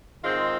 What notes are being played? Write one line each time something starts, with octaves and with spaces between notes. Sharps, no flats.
G#2 D#3 G#3 C4 F4